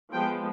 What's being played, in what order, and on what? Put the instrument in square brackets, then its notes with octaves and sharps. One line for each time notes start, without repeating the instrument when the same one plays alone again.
[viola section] F3 G#3 B3 G5